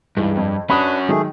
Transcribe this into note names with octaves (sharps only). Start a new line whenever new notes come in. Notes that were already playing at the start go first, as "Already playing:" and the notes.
C#2 G2 E3 D#4
F2
C#4 D4 F#4 B4 B5 C#6 D#6
D#3 F#3 G#3 A3 G#4